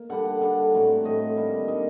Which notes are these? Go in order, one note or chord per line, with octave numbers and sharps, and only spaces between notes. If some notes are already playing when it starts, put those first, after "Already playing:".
Already playing: A#3
D3 G3 D4 F#5
F#5
D3 G3 D4 F#5
A2 F#3 C4
A2 F#3 C4 D#5
D#3 G3 A#3 D4
D#3 G3 A#3 D4 D#5